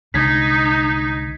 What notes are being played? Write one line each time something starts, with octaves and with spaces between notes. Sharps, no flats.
C2 D3 G#3 D#4 G#6 B6